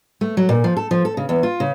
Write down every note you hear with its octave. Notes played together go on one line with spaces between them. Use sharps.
A3
F#3
A#2
F3
A4
F3
A4
C#3
E2
F4
C#3